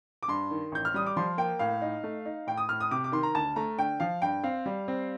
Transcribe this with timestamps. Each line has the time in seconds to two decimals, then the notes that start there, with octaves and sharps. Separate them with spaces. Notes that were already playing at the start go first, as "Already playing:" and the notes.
0.23 D6
0.28 G2 C6
0.51 D#3
0.72 A1 G6
0.85 F6
0.94 G3 D#6
1.06 D6
1.17 F3 C6
1.38 A#3 G5
1.59 A2 F5
1.82 D#4
2.04 A3
2.26 D#4
2.47 A2 G5
2.57 D#6
2.69 A2 F6
2.81 D#6
2.91 C3 D6
3.04 D6
3.12 D#3 C6
3.23 A#5
3.35 D2 A5
3.56 A3 A#5
3.78 D3 G5
4.00 F3 F5
4.22 G2 G5
4.44 C4 F5
4.66 G3
4.88 C4